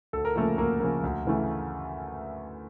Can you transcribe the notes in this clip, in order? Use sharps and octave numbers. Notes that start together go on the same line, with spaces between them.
D2 A4
A#4
C#3 F3 A3 A#3 A4
D2 A#3 A#4
C#3 F3 A#3
D2
C#3 E3 A3